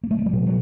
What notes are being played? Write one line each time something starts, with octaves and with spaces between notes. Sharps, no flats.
A#3
A3
G#3
G3
B2 F#3
F#3